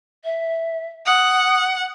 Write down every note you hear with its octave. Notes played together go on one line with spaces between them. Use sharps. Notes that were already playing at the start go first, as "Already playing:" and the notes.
E5
F#5 D#6